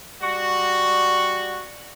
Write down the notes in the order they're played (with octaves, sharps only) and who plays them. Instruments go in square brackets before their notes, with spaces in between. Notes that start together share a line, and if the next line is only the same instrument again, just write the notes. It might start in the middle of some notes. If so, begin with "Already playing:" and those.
[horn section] G3 F#4